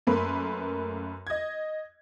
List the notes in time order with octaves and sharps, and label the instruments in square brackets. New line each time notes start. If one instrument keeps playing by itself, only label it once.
[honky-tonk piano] F#2 A3 A#3 B4 C6
D#5 G#6